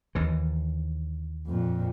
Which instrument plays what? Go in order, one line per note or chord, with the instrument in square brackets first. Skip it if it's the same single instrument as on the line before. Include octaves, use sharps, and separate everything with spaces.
[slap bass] D#2 E3
[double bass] F2 A#2